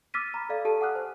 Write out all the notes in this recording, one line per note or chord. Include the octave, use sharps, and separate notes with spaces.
D6 E6 F6 A6 B6 D#7
A#5 B5
A4 D5 F5
G4 A4 A5 D#7
F#5 G#5 D6 D#6 F6 F#6
C5